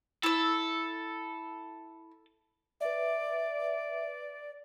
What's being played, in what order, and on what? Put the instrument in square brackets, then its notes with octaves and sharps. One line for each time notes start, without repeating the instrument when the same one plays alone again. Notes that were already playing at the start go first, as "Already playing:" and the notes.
[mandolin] E4 E6 [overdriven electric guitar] A4
[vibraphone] B4 E5 [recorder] D5